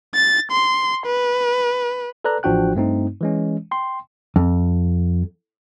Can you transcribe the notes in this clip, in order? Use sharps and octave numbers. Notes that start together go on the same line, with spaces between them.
A6
C6
B4
A4 B4 D5 A#5 F#6
A1 F3 D4 F#4 G5 F#6
G2 A3 C4 D#4
E3 G#3 C#4
G5 C6
F2